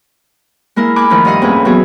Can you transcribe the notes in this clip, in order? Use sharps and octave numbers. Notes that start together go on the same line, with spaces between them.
G#3 A#3 E4 A#4
G#5 B5 D6 F#6
D#3 F3 A3 D#4 E4
G2 E4 D#5 F5 F#5 D#6
F2 A2 A#3 C#4 G#4 B4
E3 F#3 B3 F#4 G#4